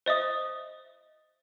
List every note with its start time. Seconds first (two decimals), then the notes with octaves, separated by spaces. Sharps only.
0.06 C5 D#5 E5 D#6